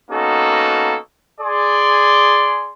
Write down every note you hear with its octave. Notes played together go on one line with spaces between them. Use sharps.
A#3 B3 C#4 D#4 F#4 A4
G#4 D5 C6